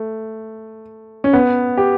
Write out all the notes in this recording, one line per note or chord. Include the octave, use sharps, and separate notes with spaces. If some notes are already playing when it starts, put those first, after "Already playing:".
Already playing: A3
C#4
B3
G4